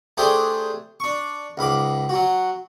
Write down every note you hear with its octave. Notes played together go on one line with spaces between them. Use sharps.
A3 D4 G4 G#4 C5 G5
D4 C#6
C#2 G#2 B5 D6
F#3 F#4